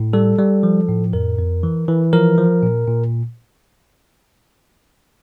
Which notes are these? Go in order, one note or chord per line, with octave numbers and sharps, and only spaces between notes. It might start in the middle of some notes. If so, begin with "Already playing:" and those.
Already playing: A2
G3 A4
G3
F3
A2
F2 A#4
F2
E3
E3
F3 A#4
F3
A#2
A#2